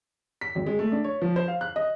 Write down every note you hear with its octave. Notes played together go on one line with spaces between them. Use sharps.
B6
G#1
G#3
A3
D4
C#5
F3
C5
F5
F#6
D#5